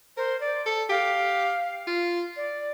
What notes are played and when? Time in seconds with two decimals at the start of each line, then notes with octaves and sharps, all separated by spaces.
0.17 A#4 C5
0.41 D5
0.66 A4
0.89 G4 F5
1.87 F4
2.36 D5